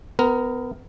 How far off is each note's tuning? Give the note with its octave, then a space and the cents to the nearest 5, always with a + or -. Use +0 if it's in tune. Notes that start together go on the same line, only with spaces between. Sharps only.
B3 +25 A#4 +0